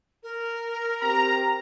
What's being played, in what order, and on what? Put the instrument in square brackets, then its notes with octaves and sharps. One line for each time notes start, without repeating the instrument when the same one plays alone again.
[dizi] A#4
[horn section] C4 G4 A#5